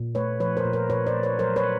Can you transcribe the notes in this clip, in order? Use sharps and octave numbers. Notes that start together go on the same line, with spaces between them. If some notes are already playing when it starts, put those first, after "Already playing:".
Already playing: A#2
A3 B4 C#5
F3 B4 C#5
A#4 C5
A#2
A#4 C5
A#2 B4 C#5
C5 D5
A3
B4 C#5
F#3 A#4 C5
B4 C#5